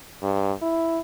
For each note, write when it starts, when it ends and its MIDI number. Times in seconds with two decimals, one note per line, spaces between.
0.23 0.52 43
0.62 1.00 64